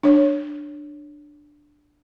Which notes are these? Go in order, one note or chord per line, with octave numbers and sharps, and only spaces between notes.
D4 C#5